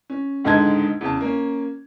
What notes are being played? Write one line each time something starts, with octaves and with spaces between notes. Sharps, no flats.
C#4
C#2 G#2 D3 D#4 A5 G#6
E2 C#3 A5
A#3 C#4